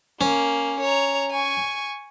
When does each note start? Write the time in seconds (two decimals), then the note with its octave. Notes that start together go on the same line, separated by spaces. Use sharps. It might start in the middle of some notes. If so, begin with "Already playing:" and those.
0.21 A#3 C#4
0.81 C#5 A#5
1.30 G#5 C#6